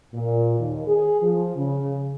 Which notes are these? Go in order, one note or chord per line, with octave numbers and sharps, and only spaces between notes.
A#2
D#2
G#4
F3
C#3